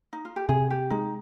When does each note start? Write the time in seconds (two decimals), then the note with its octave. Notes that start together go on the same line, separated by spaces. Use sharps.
0.13 D#4
0.25 F4
0.36 G4
0.49 C3 G#4
0.70 G4
0.90 G#3 D#4